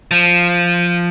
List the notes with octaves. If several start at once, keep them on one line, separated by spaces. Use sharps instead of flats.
F3